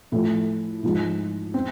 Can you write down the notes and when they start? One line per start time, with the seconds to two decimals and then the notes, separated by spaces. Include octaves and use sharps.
0.12 A2 F3 A3 E4
0.83 G#2 F3 G#3
1.54 C4